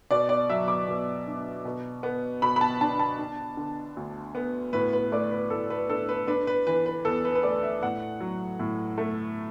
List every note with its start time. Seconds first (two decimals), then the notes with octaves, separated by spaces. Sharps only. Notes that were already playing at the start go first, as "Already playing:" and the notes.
0.11 B2 D5
0.29 D5
0.50 F#3 E5
0.68 D6
0.88 B2
1.27 D4
1.65 B2
2.03 B3
2.42 B2 B5
2.56 B5
2.61 A5
2.81 D4 A5
2.99 A5
3.19 D4
3.57 D3
3.97 D2
4.35 B3
4.73 A2 B4
4.93 B4
5.12 A3 D5
5.31 B4
5.50 A2 A4
5.70 B4
5.89 D4 A4
6.09 B4
6.27 D4 B4
6.47 B4
6.67 E3 B4
6.86 B4
7.05 E2 A4
7.25 B4
7.35 B4
7.43 A3 D5
7.63 E5
7.83 A2 F#5
8.20 F#3
8.59 A2
8.98 A3